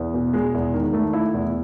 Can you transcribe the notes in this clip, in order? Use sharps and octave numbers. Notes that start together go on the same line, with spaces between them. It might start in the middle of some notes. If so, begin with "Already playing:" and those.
Already playing: E2
B2
G#3
E2
D#3
A3
E4
E2